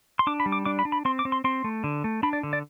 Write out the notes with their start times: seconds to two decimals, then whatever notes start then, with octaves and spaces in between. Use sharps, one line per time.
0.19 C6
0.27 D4 D6
0.40 B5
0.46 G3
0.52 D6
0.65 D4 D6
0.79 B5
0.85 D4
0.92 B5
1.05 C4 C6
1.19 D6
1.25 C4
1.32 C6
1.44 C4 C6
1.64 A3
1.84 D3
2.04 A3
2.23 D4 B5
2.33 D5
2.43 D3
2.53 D5